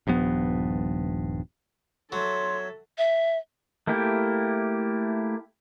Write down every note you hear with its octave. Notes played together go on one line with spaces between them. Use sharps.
D#1 G2 F3 B3
F#3 A4 C#5 E5 C6
E5
A3 A#3 E4 G4